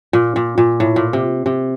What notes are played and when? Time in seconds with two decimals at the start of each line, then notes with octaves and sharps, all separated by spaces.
0.13 A#2
0.36 A#2
0.58 A#2
0.80 A2
0.96 A#2
1.13 C3
1.46 C3